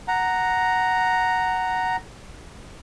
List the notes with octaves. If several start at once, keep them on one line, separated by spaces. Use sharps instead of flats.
F#5 A#5